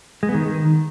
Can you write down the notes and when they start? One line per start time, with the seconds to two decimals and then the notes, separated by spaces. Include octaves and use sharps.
0.23 G#3
0.29 B3
0.35 D#3